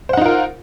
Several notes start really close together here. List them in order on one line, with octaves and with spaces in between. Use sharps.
C5 F#5 D#4 F4 A#4